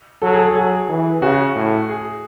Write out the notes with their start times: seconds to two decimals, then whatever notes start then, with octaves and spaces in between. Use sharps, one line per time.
0.22 F#3 A4
0.33 G#4
0.39 A4
0.55 F#3 G#4
0.89 E3
1.21 C#3 F#4
1.55 A2
1.89 G#4